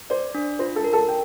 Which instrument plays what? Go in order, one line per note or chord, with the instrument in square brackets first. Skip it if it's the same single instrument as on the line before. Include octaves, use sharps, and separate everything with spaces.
[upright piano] C5 [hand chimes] D5
[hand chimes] D4
[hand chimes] F4 [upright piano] C5
[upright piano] A4 A5
[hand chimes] A#4
[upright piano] A4 A5
G5